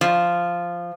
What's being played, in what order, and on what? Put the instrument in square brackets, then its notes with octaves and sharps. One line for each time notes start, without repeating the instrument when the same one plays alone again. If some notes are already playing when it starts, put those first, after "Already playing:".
[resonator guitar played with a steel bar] F3